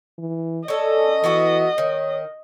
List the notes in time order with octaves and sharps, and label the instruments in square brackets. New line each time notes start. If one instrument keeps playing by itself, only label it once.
[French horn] E3
[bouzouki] C#4 A4 [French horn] D5 [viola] D#5
[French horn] E3 [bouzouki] B3 E4 F#4
[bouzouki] D#3 [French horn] C#5